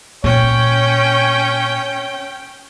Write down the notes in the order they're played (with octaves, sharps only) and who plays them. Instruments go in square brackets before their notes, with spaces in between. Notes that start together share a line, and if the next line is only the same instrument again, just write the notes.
[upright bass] A#2 [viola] C#4 G5 [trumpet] C#5